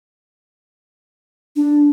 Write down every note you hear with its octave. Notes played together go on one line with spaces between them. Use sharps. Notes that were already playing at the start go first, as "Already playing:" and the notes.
D4